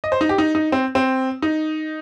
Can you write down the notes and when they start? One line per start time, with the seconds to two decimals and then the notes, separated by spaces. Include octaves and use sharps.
0.04 D#5
0.12 C5
0.21 D#4
0.29 G4
0.38 D#4
0.55 D#4
0.72 C4
0.95 C4
1.42 D#4